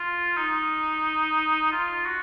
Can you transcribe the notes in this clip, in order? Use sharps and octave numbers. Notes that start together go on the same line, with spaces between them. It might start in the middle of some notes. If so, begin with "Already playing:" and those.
Already playing: F4
D#4
F4
F#4